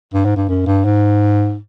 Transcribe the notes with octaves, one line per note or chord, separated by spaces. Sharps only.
G2
G#2
G2
F#2
G2
G#2